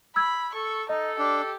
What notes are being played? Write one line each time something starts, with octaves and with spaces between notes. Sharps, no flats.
B5 E6 G#6
A4 C#6
D#4 A4 D#5
D4 G4